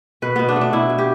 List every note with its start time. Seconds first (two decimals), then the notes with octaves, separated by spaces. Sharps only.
0.22 B2 B4
0.36 B2 B3
0.49 D4
0.56 A3
0.61 D4
0.73 B2 E4
0.90 B2
0.98 G4